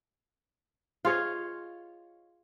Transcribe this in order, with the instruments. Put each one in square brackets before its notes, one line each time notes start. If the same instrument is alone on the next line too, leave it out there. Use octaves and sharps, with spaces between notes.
[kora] F4 G#4 C#5 D#5